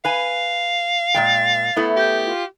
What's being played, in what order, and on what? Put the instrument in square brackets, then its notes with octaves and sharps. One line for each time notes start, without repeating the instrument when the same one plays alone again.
[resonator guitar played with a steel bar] B4 G#5 [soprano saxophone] F5
[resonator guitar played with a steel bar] A#2 G#3 G5 [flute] A6
[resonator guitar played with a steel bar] A3 B3 E4
[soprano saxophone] G4 [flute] G6
[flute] F4